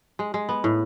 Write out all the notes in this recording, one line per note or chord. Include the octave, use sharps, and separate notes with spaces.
G#3
G#3
B3
A2